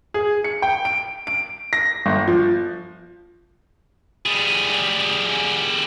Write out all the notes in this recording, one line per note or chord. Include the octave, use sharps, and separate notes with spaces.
G#4
C#7
G5
D7
D7
A#6
G1
F3
G3 G#4